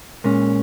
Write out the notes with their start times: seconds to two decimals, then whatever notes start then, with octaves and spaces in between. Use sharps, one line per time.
0.24 A#2 G#3 C#4